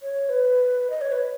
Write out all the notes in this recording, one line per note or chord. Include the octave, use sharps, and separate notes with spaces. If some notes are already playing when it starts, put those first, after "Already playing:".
C#5
B4
D#5
C#5
B4